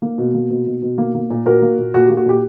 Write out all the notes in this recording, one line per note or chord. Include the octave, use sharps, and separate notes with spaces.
A#3
B2
A#3
B2
B2
B2
A#3
A#3
A#2
A#2 F#4 A#4
A#3
A#2
A#2 F#4
A#3 G4
F#4
A#2 G4